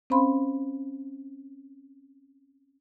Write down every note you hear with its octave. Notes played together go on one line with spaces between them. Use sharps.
C4 C#4 C5 F5 B5 C6